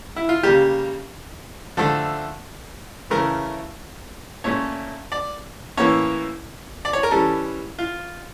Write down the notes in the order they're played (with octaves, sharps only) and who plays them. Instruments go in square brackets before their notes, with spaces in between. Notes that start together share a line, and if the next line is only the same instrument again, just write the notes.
[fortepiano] E4
F4
C#3 G3 A#3 G4
D3 F3 A3 A4
C#3 E3 A3 C#4 A#4
A#2 A3 C#4 C#5
D5
A2 E3 A#3 C#4 C#5
D5
C#5
A#4
E3 G3 C#4 A4
F4